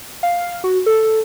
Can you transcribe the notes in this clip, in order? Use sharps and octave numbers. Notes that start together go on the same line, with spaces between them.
F5
F#4
A4